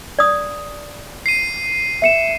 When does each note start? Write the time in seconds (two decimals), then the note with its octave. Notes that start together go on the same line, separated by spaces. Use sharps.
0.19 D5 D#6
1.26 C7 D#7
2.02 E5 C#7 E7